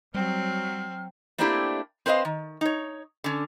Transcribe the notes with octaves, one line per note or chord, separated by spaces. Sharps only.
F#3 G3 C4 F6
A3 A#3 C4 D4 E4 G4
C4 B4 C5 D#5 F5
D#3
D#4 C#5
D3 C#4